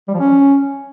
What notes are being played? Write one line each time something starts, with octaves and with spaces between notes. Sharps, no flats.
G3
F3
C#4